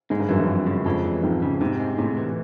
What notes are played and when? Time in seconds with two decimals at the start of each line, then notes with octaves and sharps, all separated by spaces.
0.10 G#2 G#3
0.20 G2
0.29 F#2 E3
0.40 G2
0.48 F2
0.66 C#3
0.85 F2 G#3
1.04 E3
1.23 F2 G#2
1.42 C#3
1.61 G#2 C3
1.79 G#3
1.98 A2 C3
2.17 E3